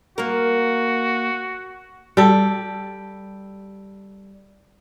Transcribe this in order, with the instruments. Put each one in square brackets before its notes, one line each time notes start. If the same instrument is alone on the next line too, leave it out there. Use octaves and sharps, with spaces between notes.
[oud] A#3 A#4 [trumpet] F#4
[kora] G3 A4